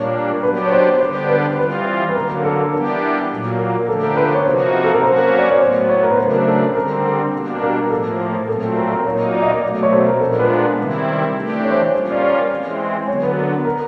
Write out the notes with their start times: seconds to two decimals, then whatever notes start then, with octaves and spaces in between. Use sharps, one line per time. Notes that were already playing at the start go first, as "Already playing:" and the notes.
Already playing: A#2 G3 A#3 D4 C#5
0.43 F#3 B3 D4 G4 B4
0.66 C#5
0.72 C5
1.00 D3 G3 B3 D4 G4 C5
1.29 B4
1.58 E3 G3 C4 F4 B4
2.09 B4
2.15 D3 F#3 A#3 A#4
2.30 A#4
2.44 A4
2.73 E3 G3 B3 D4 G4 A#4
3.30 A#2 F#3 A#3
3.59 A#4
3.88 D3 F3 A3 D4 G4 A4
4.03 A#4
4.17 B4
4.34 C#5
4.45 C3 F3 A#3 D#4 F#4 C5
4.84 A4
4.94 A#4
5.03 F#3 A#3 C#4 F#4 C5
5.39 D5
5.50 C#5
5.61 A2 F#3 B3 C5
5.89 C#5
6.03 A#4
6.11 B4
6.17 C#3 F#3 A3 D4 C5
6.32 A#4
6.47 A4
6.75 D3 G3 C4 A#4
7.33 B2 G3 A#3 D4
7.62 A#4
7.90 A2 F3 A#3 A4
8.48 A#2 F#3 A3 C4 A4
8.77 A#4
8.91 A#4
9.05 A#2 F#3 A#3 D#4 C#5
9.34 D5
9.42 D#5
9.52 D5
9.63 B2 F#3 A3
9.83 C#5
9.92 C5
10.07 A#4
10.20 A#2 F3 G#3 B3 D4 A4
10.30 A#4
10.39 B4
10.78 C3 D#3 G3 C4 E4
11.36 E3 A3 D4 G4
11.64 C#5
11.71 C5
11.79 C#5
11.93 G3 A#3 C#4 F4
12.12 D5
12.22 C#5
12.50 E3 G#3 C4
13.08 D3 F#3 B3 C#5
13.23 B4
13.37 A#4
13.65 A#4